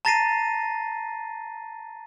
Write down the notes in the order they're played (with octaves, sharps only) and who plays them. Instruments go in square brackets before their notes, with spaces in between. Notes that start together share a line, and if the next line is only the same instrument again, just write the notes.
[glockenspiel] A5 A#5 A6 A#6 C7 D#7